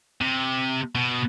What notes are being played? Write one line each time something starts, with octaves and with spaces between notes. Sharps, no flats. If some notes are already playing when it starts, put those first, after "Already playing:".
C3
B2